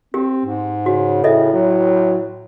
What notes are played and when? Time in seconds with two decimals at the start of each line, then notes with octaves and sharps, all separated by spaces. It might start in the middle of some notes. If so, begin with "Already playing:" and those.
0.14 C4 G4
0.45 G#2
0.86 C#3 F#4
1.24 A2 A4 D#5 E5
1.53 F#3